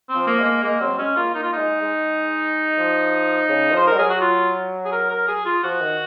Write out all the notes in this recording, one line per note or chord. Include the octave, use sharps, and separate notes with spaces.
C4
F3
A#3
G#3
A#3
G#3 A#3
F#3 C4
G#3 C#4
A#3 F4
A#3 D#4
F4
D#4
G#3
G#3
F3
C#3
F3 C5
G#3 A#4
F#3 G#4
F#4
F4
G#4
A#4
A#4
G#4
F4
F3 F#4
D#3